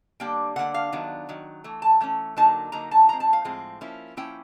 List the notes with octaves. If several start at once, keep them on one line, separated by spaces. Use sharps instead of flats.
D3 G3 A#3 D4 G5
D3 G3 A#3 D4 F#5
F5
D#3 F#3 B3 D4
D#3 F#3
E3 A3
A5
E3 A3 C#4
D3 F#3 A#3 D#4 A5
D3 F#3 A#3 D#4 A#5
A5
A2 F3 G#3 C4 A#5
A5
F5
A2 F3 G#3 C4
F3 A#3 C#4 E4
F3 A#3 C#4 E4 G5